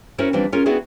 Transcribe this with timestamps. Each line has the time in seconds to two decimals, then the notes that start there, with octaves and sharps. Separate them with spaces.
0.18 C#4 E4 F#4 A#4 C5
0.33 E3 F3 G3 C4 D4 F4
0.52 C#4 F4 G#4 A#4
0.66 B3 C4 D4 E4 F#4 G#4